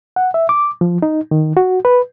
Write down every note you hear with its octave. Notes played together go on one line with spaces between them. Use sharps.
F#5
E5
D6
F3
D#4
D#3
F#4
B4